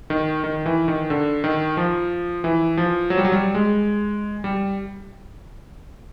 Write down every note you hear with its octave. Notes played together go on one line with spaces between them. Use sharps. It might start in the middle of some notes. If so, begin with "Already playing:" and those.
D#3
D#3
E3
D#3
D3
D#3
F3
E3
F3
F#3
G3
F#3
G3
G#3
G3